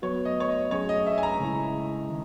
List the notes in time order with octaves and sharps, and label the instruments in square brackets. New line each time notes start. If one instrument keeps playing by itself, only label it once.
[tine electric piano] F#3 B3 F#4 B4 [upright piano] C#5
[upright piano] D#5
C#5
D#5
[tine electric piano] F#3 C#4 G#4 [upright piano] C#5
[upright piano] D#5
E5
G#5
A#5
[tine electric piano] C#3 G#3 C#4 E4
D#3